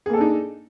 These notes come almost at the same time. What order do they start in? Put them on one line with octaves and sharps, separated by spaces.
G#4 A#3 A4 D4 D#4